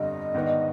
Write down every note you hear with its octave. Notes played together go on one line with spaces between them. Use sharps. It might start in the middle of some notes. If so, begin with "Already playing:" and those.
Already playing: G1 F2 D3 G3 D#5
G#2 D#3 B3 D4